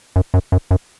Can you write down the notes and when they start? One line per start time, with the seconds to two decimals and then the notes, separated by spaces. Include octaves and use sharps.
0.16 F#2
0.34 F#2
0.52 F#2
0.71 F#2